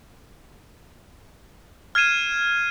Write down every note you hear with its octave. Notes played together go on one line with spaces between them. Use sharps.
F6 G#6 C7 D#7 E7